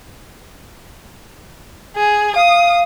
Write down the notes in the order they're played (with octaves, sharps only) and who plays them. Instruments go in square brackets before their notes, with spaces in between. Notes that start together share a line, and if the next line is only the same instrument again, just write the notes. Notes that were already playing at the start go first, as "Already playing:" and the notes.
[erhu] G#4
[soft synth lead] F5 [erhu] D#6